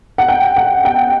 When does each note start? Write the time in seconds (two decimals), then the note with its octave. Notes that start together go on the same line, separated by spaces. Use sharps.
0.18 F#5
0.29 G5
0.56 F#5
0.85 G5